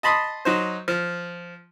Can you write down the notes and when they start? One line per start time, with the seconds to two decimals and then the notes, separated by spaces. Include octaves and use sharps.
0.03 D#5 A5 B5 C6 D#6
0.45 F#3 D#4 C5
0.88 F3